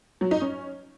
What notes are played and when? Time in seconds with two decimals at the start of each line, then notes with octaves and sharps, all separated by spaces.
0.21 F#3
0.31 D#4
0.41 C#4